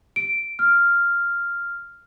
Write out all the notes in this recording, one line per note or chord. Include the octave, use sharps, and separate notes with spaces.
D7
F6